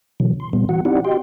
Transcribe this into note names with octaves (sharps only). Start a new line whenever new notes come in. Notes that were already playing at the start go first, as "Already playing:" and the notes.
B2 D3 E3 F#3
C6
A#2 G3 B3
E3 F#4 F#5
C4 D#4 E4 G4 D5 F#5
F#4 G4 D#5 G5 C6